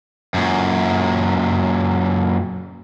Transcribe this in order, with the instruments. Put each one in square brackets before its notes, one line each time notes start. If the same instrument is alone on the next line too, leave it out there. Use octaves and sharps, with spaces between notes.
[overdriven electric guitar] F#2 A#2